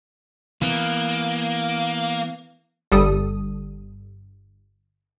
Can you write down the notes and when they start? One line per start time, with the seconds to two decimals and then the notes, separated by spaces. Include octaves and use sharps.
0.62 E3 A#3 B3
2.92 G1 G3 A4 D#6